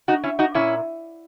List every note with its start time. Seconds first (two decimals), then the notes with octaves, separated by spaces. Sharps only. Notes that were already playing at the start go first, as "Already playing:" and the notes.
0.08 D#4 F#4
0.24 C#4 E4
0.39 D#4 F#4
0.54 A#2 C#4 E4